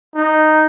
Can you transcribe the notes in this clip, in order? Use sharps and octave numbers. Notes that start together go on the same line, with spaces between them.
D#4